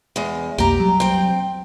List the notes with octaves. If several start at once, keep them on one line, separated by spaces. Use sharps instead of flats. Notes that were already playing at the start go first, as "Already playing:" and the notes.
E2 G#3
B1 F2 A#3 G4 A#5
F#3 G3
C4 G5